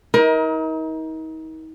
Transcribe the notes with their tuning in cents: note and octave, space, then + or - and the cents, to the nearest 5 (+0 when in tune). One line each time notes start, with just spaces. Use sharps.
D#4 +40 A#4 +25